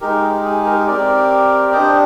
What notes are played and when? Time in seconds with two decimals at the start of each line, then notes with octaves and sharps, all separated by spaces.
0.01 G#3 D#4 G4 A#4
0.22 G#4
0.44 G#4
0.66 A#4
0.87 C4 G4 A#4 D5
1.73 D4 G4 C5 D#5